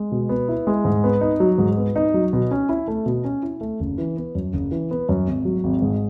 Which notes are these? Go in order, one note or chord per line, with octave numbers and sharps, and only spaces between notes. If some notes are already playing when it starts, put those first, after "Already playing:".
Already playing: G#3
B2
B3
E4
G#3
G#2
B3
D#4
F#3
G#2
B3
D#4
F#3
B2
C#4
E4
A3
B2
C#4
E4
A3
F#1
E3
B3
F#2
F#1
E3
B3
F#2
G#1
F#3
G#1
G#2